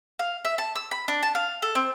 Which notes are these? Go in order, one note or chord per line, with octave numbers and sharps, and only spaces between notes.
F5
E5
A5
E6
B5
D4
A5
F5
A4
C4